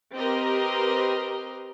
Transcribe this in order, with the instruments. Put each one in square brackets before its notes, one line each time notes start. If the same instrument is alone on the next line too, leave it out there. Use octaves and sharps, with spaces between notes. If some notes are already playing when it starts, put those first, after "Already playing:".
[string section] C4 G4 A#4 B4 D#5 C6